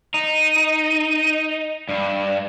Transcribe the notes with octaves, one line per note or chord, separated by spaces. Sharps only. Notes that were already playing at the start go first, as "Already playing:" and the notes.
D#4
G2